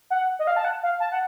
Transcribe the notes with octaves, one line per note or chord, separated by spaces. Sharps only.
F#5
D#5
F5
A5
F#5
F5
A5
F#5